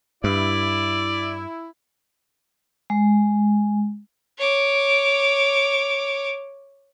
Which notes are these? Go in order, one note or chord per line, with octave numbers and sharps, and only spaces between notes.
G2 E4 D5
G#3
C#5 D6